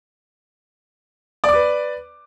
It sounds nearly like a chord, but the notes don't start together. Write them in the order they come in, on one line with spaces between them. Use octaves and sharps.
D5 D6 B4